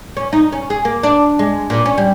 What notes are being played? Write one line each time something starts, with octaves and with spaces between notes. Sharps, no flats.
C#4
D#4
C#4
G#4
A#3
D4
G#3
A#2
C#4
G3